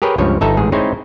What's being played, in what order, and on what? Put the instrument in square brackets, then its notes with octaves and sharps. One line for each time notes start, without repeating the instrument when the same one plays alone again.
[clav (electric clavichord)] G4 G#4 A#4 B4 C#5 G5
C#2 G2 F3 C#5
G1 D#4 A4 E5 A#5
A1 G#2 G#4
G#3 C4 D#4 E4 C5 C#5